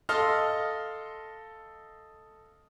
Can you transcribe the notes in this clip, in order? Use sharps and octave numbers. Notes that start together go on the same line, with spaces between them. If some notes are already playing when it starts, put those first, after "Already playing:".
A4 D#5 F5 C6 F6